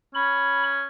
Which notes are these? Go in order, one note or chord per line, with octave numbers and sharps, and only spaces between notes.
C#4 B5